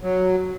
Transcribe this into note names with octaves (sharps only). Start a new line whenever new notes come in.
F#3